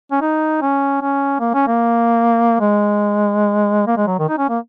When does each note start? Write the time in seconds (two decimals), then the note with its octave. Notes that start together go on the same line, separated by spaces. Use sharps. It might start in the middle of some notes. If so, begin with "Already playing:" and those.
0.12 C#4
0.21 D#4
0.61 C#4
1.02 C#4
1.40 A#3
1.54 C#4
1.67 A#3
2.60 G#3
3.87 A#3
3.97 G#3
4.07 F#3
4.19 D#3
4.29 D#4
4.38 C#4
4.49 A#3